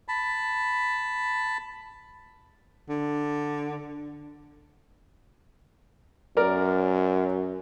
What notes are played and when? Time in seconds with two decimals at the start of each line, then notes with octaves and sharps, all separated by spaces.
0.08 A5 B5
2.89 D3
6.37 F#2 A#4 D5